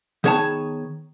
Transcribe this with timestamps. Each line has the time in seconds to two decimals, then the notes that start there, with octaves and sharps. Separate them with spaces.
0.24 D#3 B3 G#4 C#5 E5 A5